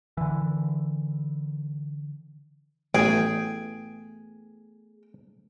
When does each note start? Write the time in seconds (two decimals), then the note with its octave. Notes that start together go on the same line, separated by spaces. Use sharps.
0.17 D3 E3
2.94 A1 A3 B3 G#4 G5